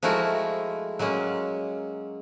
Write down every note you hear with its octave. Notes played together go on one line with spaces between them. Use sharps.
F3 G#3 A3 E4 F#4 A#4
F#3 G#3 A#3 C#4